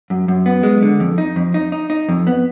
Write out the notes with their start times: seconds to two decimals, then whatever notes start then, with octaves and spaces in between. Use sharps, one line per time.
0.10 F#2
0.28 F#2
0.46 B3
0.63 G#3
0.82 D3
1.00 F2
1.18 D#4
1.36 F2
1.54 D#4
1.72 D#4
1.90 D#4
2.09 F2
2.27 B3